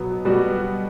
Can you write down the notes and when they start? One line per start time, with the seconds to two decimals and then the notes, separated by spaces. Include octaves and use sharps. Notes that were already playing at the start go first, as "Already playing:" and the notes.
Already playing: B2 F#3 B3
0.25 B2 G3 B3 F#4